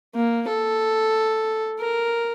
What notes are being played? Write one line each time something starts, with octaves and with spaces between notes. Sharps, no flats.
A#3
A4
A#4